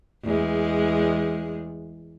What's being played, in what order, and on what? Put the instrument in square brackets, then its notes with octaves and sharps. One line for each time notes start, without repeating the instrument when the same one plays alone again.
[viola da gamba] E2 G#3